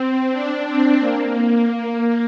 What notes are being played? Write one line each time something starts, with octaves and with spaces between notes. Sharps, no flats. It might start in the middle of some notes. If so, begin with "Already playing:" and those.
Already playing: C4
D4
C4
A#3